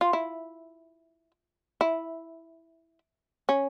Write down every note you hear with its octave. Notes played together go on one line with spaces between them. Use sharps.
F4
E4
E4
C#4